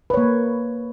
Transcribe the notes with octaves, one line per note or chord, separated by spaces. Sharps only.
A#3 B4 C#5